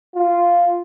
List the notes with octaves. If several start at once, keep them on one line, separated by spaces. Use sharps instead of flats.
F4